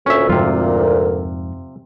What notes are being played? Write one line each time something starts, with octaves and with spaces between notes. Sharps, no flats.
D2 A#2 C#4 E5
F2 G#2 C3 A3 F4